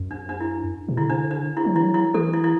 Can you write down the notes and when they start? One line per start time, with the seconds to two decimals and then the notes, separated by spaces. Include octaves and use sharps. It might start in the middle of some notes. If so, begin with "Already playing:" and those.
Already playing: F#2
0.11 D4
0.29 D4
0.41 E4
0.88 B2
0.97 D3 E4
1.10 D4
1.31 D4
1.57 E4
1.65 F#3
1.75 E3 E4
1.83 F#3
1.94 E4
2.14 E3 A4
2.33 E4
2.44 E4